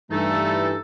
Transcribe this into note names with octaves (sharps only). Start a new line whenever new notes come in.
G2 E3 A3 D#4 A4